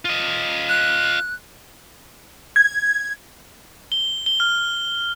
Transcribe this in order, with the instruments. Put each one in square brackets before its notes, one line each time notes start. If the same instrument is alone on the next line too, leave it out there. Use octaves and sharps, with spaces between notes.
[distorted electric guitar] F4 D#5
[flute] F#6
[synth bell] G#6
[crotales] G7
G7
F6